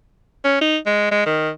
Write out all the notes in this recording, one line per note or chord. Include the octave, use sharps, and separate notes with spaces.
C#4
D#4
G#3
G#3
D#3